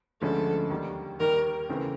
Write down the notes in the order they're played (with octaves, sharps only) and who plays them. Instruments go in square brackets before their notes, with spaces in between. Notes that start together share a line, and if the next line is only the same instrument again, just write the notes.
[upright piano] D2 D3 F3 G#3 C#4 [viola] A4
[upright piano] D#2 D#3 G3
[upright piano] D#2 D#3 G3 [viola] A#4
[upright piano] E2 C#3 E3 A3 C4